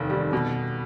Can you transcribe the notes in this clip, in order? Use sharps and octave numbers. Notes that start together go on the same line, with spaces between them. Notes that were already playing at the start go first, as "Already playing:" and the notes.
Already playing: F1 D#2 D#3
G3
B2